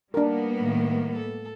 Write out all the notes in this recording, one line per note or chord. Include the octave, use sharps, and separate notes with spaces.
G3 A#3 B3 D4 A#4
A2 D#3
A4